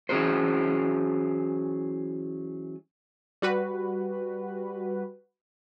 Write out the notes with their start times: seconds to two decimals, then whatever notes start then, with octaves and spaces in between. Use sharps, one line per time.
0.09 E3 F#3 C#4 F4 G#4 C5
3.42 G3 F#4 B4